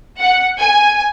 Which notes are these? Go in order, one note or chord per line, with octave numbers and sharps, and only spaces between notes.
F#5
G#5